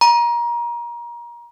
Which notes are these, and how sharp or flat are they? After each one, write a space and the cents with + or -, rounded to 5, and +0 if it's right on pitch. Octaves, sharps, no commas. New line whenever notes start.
A#5 +30